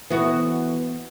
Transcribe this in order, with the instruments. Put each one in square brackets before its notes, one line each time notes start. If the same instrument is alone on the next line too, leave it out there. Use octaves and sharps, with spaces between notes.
[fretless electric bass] E3 [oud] B3 F#4